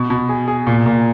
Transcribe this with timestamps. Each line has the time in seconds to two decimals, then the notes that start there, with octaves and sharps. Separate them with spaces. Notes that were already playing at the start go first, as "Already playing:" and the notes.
Already playing: B2
0.10 B2
0.29 G#4
0.48 G#4
0.67 A#2
0.86 A#2